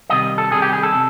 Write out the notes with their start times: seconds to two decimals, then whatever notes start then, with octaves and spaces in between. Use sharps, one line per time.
0.10 C3 D#3 G3 D#5
0.38 A4
0.52 C3 D#3 G3 G#4
0.62 G4
0.73 G#4
0.83 A4
0.94 C3